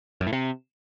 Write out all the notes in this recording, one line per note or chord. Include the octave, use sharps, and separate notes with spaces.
F#2
A2
C3